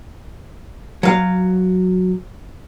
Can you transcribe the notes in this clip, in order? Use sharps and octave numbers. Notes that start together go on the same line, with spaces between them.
F#3 F5